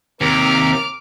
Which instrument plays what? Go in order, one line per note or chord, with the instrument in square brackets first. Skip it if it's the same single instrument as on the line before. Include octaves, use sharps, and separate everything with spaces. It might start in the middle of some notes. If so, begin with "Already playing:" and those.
[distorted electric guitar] D#2 [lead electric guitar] C3 [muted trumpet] A#4 [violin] D6 F6